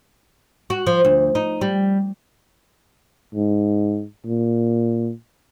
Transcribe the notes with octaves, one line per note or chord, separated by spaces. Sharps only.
F#4
F3
D2
D#4
G3
G#2
A#2